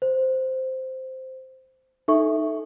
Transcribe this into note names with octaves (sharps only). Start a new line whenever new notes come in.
C5
D#4 A4 E5 C#6